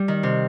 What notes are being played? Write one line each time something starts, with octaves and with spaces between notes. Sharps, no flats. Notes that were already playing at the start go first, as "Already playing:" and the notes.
Already playing: G3
D#3
C3